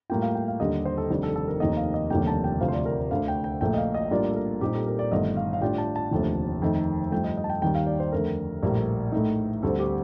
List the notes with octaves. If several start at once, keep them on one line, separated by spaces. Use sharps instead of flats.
A2 G3 A#3 F4 G5
F5
G5
F5
D#2 D3 G3 D#5
C5
A4
F1 F2 D#3 G3 D4
A4
A4
A#4
F1 D#2 D#3 A#3 D#5
F5
D#5
F1 D#2 D3 G3 A#3 G5
A5
G5
D2 C3 F3 F5
C5
D5
A#4
D2 D3 A3 F5
G5
G5
A#1 A#2 A3 G5
D#5
F5
D#5
A2 G3 A#3 D4 F4 D5
A4
A#4
A#2 G3 C4 D#4 G4
A4
A#4
D5
G1 G2 D#3 A3 D#5
F5
F5
A2 G3 D4 F4 G5
A5
A5
F1 D#2 D3 F3 A3
F2 D#3 A3 D#4
G2 F3 A3 G5
D#5
D#5
A5
G5
D#2 D#3 G3 G5
F5
D5
C5
F2 D3 A3 A#4
A#1 A2 G3 A#3
A2 A3 D#4
D2 D3 G3 C4 A4
G4